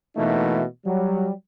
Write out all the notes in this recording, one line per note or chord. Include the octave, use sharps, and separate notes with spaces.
B2 E3 A3 A#3 D#4 F#4
F#3 G3